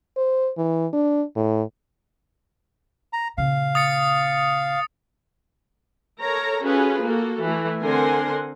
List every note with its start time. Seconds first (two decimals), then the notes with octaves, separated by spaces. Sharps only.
0.17 C5
0.57 E3
0.93 D4
1.36 A2
3.13 A#5
3.38 A#2 C#3 F5
3.75 D#6 A6 C#7
6.21 A4 A#4 C#5 A#5
6.65 C#4 F4 F#4 G#4 A4 B4
7.02 A#3 F#4 A4
7.44 E3 A3
7.83 D3 C4 A#4 F#5 G#5 C6